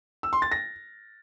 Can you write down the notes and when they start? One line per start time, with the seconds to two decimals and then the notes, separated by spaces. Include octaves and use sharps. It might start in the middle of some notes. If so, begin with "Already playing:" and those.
0.23 E6
0.33 C6
0.42 A6
0.51 A#6